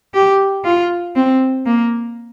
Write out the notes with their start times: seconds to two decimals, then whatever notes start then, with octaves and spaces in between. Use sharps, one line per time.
0.14 G4
0.65 F4
1.16 C4
1.66 A#3